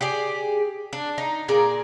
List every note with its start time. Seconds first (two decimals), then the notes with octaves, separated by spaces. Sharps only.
0.01 G4 G#4 D5
0.93 D4
1.18 D#4
1.48 A#2 G#4 A#4 D5